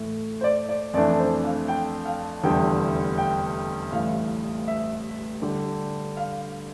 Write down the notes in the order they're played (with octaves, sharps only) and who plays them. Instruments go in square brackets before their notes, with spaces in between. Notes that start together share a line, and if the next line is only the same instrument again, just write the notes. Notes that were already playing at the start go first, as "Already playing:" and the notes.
Already playing: [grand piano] A2 E3 A3
[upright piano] C5
D5
D5
[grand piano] F2 E3 A3 D4 [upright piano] D5
[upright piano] C5
F5
G5
F5
[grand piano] F1 E2 D3 G3 D4 [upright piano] G5
[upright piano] G5
[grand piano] A1 A2 E3 G3 [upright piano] F5
[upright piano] E5
[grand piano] D3 G3 D4 G4
[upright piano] F5